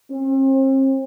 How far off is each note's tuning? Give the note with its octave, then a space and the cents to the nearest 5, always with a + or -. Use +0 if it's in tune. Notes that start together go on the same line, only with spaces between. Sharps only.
C4 +40